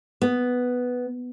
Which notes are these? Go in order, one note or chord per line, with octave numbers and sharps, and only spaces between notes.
B3